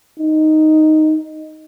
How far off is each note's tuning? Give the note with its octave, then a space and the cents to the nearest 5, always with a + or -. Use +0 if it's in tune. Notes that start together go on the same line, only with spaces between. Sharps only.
D#4 +0